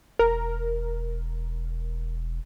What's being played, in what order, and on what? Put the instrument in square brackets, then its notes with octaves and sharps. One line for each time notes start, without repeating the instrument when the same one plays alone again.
[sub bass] E1 [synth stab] A#4